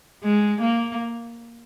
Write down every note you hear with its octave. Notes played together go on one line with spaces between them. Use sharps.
G#3
A#3